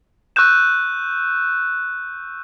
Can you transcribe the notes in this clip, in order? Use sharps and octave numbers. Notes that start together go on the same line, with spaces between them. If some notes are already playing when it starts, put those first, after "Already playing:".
C#6 E6 F#6 G6 E7